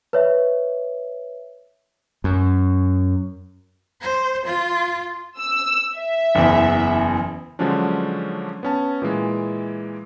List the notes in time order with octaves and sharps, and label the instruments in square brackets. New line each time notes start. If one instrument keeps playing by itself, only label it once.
[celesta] B4 C#5 E5
[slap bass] F#2
[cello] C5
F4
[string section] E6
E5
[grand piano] F#1 E2
[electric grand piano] D3 F3 F#3 G#3 C#4 D4
B3 C#4 A5
A#2 E3 G#3